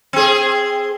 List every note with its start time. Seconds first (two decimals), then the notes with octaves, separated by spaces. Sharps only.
0.13 C4 G#4